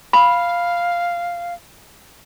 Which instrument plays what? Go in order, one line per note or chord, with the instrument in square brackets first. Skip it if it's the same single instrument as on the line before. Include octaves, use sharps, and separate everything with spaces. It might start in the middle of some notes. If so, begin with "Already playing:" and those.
[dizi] F5 [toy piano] B5